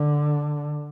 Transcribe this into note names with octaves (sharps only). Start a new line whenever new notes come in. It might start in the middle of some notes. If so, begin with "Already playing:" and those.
Already playing: D3